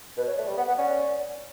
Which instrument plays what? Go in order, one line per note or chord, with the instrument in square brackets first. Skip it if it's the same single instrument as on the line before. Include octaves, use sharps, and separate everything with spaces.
[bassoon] B2 [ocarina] B4
[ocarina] C#5
[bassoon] A3 [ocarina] D5
[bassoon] G3
[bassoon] B3 [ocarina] F#5
[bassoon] B3 [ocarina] F#5
[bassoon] C#4 [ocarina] D5